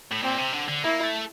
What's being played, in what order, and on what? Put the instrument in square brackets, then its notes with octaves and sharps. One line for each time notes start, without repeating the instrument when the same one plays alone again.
[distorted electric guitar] A2
[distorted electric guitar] A#2 [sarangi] C4
[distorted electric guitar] C3
D3
D3
[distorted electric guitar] A#3 [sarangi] E4
[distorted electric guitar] A3